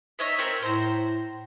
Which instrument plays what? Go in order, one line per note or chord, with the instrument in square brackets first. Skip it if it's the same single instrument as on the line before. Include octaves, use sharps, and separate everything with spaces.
[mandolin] D#4 C#5 E5
C4 C#4 A#4
[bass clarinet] A2 [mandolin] C5 A#5